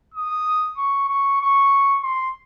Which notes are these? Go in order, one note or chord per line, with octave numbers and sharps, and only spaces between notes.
D#6
C#6
C#6
C#6
C6